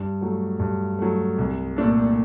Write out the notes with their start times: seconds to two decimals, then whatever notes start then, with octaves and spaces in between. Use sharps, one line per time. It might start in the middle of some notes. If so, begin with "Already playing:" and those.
Already playing: G2
0.21 F#3 A3
0.59 G2
0.99 F#3 A3
1.38 C2
1.76 A#2 A3 D4 A4